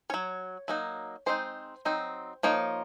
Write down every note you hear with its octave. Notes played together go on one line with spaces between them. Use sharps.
F#3 C#4 C#5
F#3 A#3 D#4
G#3 C4 D#4 C5
F#3 C4 D#4
F3 A#3 D#4 C#5